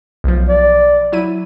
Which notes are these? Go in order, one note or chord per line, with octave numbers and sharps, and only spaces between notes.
B1 F3
D5
F#3 E4 D#7